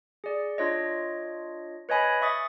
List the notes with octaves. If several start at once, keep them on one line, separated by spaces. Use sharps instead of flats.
G#4 D5
D4 F4 C#5 D#5
B4 C#5 D#5 G#5 B5
E5 C#6 D#6 A6